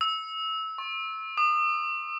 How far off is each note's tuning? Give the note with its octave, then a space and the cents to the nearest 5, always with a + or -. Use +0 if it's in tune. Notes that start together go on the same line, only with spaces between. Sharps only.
E6 -20
C#6 -40
D#6 -35